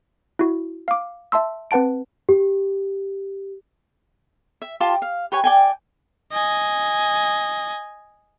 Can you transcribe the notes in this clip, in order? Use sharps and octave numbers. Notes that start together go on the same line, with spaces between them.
E4 F#4
F5 D6
E5 A5 C6 E6
C4 B4 F#5 A5 D7
G4
E5
F4 G4 A5 C6
F5
G4 B4 C#5 G#5
D5 G5 G#5
D#5 G#5